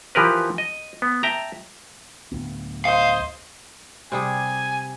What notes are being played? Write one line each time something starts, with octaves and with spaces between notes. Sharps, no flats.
E3 F3 G4 A#4 B4
D#5
B3
E5 G5 A5 A#5
D1 D2 B3
C5 D#5 F5
C3 G3 G#4 G#5